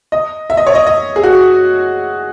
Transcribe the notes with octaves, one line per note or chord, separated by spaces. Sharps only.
D#5
E5
D#5
C#5
D#5
D#5
G#4
F#4